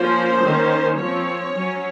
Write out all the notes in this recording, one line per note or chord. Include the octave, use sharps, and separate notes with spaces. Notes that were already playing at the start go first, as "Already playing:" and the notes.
Already playing: F3 A#3 C#4 C5
D#3 A#3 C#4
F3 C4 C#5
F#3 C#4